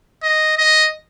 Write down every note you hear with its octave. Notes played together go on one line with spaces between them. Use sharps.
D#5
D#5